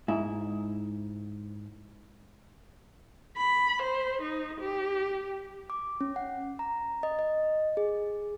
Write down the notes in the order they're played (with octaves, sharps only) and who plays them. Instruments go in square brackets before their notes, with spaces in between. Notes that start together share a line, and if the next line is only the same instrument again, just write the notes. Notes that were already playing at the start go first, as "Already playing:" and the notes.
[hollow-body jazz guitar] G#2 E4
[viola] B5
C5
D#4
G4
[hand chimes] D6
C#4
F#5
A#5
D#5
D#5
G#4